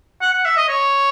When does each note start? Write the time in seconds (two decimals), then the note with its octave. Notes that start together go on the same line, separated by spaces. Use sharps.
0.21 F#5
0.33 F#5
0.45 E5
0.57 D#5
0.69 C#5